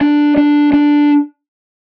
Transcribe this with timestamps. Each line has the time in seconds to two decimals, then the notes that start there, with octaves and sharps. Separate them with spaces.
0.01 D4
0.37 D4
0.73 D4